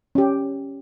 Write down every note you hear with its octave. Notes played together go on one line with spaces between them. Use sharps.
C#4 G4